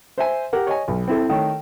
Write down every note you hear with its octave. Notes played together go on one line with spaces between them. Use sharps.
C5 E5 G#5
G4 A#4 F#5
C#5 D#5 G#5
B1
C4 E4 A4
D#3 A3 C#5